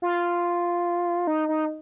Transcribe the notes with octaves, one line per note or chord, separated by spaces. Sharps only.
F4
D#4
D#4